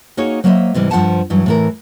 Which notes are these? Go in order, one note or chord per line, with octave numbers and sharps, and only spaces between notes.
A#3 D#4 F#4 G#4 C#5
F#3 A#3 C5 C#5 D#5 E5
G#2 C3 E3 G3
G2 F3 F#4 C5 F#5 A5
G2 E3 F#3
A2 E3 A#4